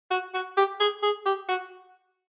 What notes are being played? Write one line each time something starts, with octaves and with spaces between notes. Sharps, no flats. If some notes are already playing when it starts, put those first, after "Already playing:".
F#4
F#4
G4
G#4
G#4
G4
F#4